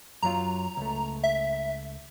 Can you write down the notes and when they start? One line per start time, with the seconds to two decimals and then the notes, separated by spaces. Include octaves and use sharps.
0.22 F#2 F#3 F4 A#5
0.77 C#2 A3
1.24 E5